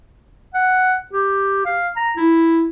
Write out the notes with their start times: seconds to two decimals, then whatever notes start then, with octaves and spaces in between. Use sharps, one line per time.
0.54 F#5
1.13 G4
1.66 F5
1.96 A#5
2.17 E4